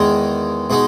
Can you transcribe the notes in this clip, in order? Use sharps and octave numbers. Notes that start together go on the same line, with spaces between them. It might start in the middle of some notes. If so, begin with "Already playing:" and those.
Already playing: E2 D#3 G#3
B2 G#3 D#4